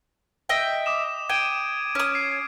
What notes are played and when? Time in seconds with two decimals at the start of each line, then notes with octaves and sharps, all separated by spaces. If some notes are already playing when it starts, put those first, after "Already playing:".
0.49 D#5 E5 G5
0.86 D6 D#6 E7
1.29 G5 G#6 D7 D#7
1.95 C#4 D#6
2.15 C7